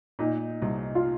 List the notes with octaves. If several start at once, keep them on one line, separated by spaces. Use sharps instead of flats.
A#2 D#4
C2
F4